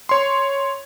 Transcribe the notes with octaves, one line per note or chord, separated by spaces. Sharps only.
C#5 C6